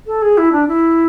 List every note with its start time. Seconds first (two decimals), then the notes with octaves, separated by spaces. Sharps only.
0.07 A4
0.22 G#4
0.38 E4
0.52 D4
0.68 E4